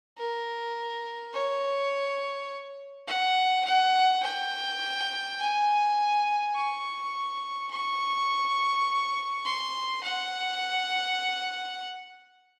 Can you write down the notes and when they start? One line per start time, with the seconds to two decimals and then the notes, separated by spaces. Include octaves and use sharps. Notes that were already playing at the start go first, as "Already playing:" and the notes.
0.18 A#4
1.33 C#5
3.07 F#5
3.65 F#5
4.23 G5
5.39 G#5
6.55 C#6
7.71 C#6
9.45 C6
10.03 F#5